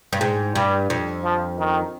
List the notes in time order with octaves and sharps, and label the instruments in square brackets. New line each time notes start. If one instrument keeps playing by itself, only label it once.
[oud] G2
G#2
[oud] G2 [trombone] G3
[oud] F2
[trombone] F3
D#3